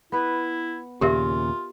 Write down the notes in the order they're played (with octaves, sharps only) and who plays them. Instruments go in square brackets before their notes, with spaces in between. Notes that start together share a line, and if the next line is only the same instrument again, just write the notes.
[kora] B3 B4 [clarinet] E4
[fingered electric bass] D#2 A#2 C#3 [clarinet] F4 [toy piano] G4 A#4 E5